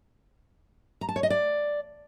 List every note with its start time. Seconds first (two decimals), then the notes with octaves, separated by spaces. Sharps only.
1.01 A#5
1.09 A5
1.16 C#5
1.23 D#5
1.30 D5